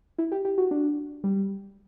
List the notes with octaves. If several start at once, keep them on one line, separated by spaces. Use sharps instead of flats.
E4
G4
G4
F#4
D4
G3